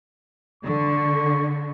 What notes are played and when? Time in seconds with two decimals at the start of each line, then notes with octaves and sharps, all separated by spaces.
0.64 D3 C#6